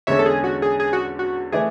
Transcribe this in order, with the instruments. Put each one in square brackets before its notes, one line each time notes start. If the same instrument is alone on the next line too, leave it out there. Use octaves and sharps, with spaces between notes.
[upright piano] E2 D3 G#3 C#4 [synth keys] C#5 E5
[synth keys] A4
G#4
F#4
G#4
G#4
F#4
F#4
[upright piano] E3 A3 E4 B4 D5 [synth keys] G#4